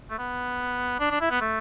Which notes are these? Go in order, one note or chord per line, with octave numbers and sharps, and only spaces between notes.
A3
B3
D4
D4
E4
B3
A3